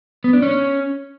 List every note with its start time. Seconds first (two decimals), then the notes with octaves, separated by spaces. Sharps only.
0.24 B3
0.33 D4
0.42 C#4